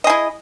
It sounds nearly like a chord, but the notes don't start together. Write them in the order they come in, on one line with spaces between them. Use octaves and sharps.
D#5 G#4 E4